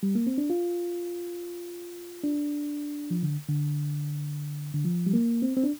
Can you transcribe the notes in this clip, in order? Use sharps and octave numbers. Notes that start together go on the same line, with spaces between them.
G3
A#3
C4
D4
F4
D4
F3
D3
D3
D3
F3
G3
A#3
C4
C4
D4